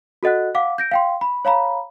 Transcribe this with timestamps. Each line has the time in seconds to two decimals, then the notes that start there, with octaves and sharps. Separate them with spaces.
0.23 F#4 A4 D#5 F#5 F#6
0.55 F5 F#5 D6
0.78 G6 A#6 D7
0.92 F5 G5 C6
1.21 B5
1.45 C#5 F5 A#5 B5